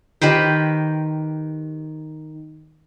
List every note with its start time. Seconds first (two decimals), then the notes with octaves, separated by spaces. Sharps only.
0.22 D#3 G4 B4 C5